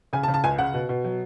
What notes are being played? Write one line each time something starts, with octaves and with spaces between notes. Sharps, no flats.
C#3 G#5
A5
C#3
A5
C#2 G#5
C#3 F#5
B2
B2
F#3